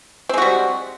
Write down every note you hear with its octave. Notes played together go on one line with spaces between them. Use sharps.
G3 G#3 C4 F#4